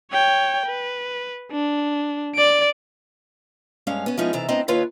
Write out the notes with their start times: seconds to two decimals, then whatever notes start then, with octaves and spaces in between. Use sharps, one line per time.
0.12 C#5 G5
0.66 B4
1.51 D4
2.35 D5 D7
3.87 G2 G#3 C#4 F5
4.06 B3 C#4
4.18 F3 G#3 B3 C#4 D#4 E4
4.33 C3 D#3 E3 A4 A#5
4.48 A2 B3 C4 D4 D#5 A#5
4.68 D#2 D#3 F4 B4 C#5 F5